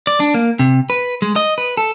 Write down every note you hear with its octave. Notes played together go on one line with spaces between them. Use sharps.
D5
D4
A#3
C3
B4
G#3
D#5
B4
A4